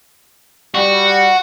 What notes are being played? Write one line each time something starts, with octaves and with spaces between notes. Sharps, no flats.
G3 F#4